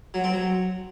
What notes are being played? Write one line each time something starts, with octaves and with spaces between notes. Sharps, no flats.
F#3
C4
F#3